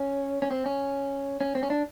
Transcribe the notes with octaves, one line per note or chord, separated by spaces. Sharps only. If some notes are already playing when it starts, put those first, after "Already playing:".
Already playing: C#4
C#4
C4
C#4
C#4
C4
C#4
D4